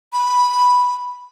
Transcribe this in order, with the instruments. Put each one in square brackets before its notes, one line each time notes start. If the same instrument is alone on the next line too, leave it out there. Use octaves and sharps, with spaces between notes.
[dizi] B5